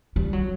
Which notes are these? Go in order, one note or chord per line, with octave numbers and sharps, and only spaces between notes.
G3
F#3